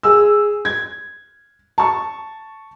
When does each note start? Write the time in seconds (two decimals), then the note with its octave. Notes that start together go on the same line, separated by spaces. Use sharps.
0.03 G#4 E6
0.65 G#6
1.78 A5 C#6